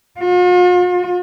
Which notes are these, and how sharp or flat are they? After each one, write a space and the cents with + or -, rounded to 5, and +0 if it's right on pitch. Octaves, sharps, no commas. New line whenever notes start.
F4 +45